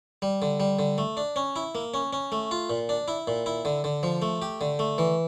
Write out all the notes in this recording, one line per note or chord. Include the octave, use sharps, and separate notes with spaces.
G3
D3
G3
D3
A3
D4
C#4
E4
A#3
C#4
C#4
A3
F4
A#2
D4
E4
A#2
E4
D3
D3
F3
A3
G4
D3
A3
E3